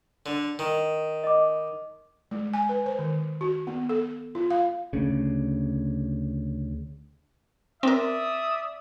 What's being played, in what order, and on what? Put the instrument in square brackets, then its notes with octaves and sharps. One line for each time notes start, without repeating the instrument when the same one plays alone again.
[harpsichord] D3
D#3
[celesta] D#5 D6
[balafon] G#3
G#5
B4
C5
D#3
F#4
B3
A4
F4
F5
[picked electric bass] D2 C#3
[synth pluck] C4 A#4 [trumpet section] D5 E5 D#6